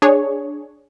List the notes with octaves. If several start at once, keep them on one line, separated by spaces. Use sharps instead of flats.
D4 G#4 C#5